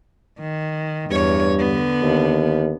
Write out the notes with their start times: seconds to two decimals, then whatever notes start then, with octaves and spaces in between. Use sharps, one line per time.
0.40 D#3
1.11 E2 G2 C#5
1.60 D3 B3
2.02 D#2